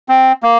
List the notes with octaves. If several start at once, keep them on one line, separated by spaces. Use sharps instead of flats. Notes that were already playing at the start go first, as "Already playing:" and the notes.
C4
A#3